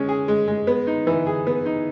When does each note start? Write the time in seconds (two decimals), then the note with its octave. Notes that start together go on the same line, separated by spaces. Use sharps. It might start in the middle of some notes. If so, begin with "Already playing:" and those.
Already playing: G#3 C#4
0.09 G#4
0.28 G#3
0.48 G#3
0.67 B3
0.87 D#4
1.07 E3
1.27 G#4
1.47 B3
1.66 D#4